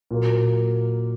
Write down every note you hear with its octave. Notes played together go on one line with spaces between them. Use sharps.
A#2 F#3 A#3